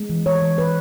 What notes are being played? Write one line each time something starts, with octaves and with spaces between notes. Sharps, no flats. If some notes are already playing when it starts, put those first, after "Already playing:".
Already playing: G#3
E3
E3 C#5
E3
E3 B4